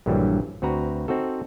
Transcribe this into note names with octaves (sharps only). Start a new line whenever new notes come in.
A#1 G2 D3 E3 F#3 G3
D2 C4 F#4 B4 A#5
C4 D#4 F#4 A4